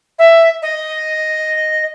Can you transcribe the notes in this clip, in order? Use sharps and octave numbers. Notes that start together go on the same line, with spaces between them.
E5
D#5